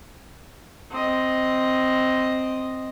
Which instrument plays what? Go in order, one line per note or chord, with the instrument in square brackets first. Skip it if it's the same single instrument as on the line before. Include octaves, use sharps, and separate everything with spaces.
[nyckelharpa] C4 D#5